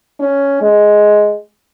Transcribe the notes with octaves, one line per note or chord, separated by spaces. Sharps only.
C#4
G#3